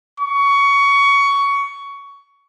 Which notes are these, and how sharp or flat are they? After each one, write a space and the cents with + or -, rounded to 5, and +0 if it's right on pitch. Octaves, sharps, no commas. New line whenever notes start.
C#6 +20